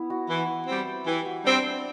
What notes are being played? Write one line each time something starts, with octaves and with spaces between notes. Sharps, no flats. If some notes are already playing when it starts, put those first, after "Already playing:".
Already playing: B3 E4
F#4
E3
G3 C4
E3 G4
F#4
G3 C4 D4